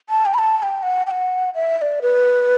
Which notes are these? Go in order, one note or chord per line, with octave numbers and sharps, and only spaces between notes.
A5
G5
B5
A5
A5
G5
F#5
G5
F#5
E5
E5
D5
B4